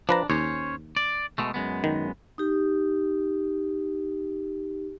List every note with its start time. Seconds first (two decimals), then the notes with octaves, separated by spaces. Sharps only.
0.09 F3 D4 B4 A#5
0.30 D#2 C#4 C5 C#5
0.97 D5
1.38 B2 G#3 A3
1.54 F#2 G#3 B3
1.84 D#3
2.38 D#4 G4